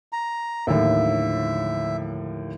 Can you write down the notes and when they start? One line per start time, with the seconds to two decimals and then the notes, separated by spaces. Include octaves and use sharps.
0.13 A#5
0.67 D#2 A2 D3 F3 F#3 E5